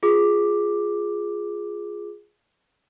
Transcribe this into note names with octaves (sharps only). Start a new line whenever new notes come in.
F4 G#4 D6